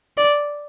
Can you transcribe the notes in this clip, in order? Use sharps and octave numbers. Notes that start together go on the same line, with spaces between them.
D5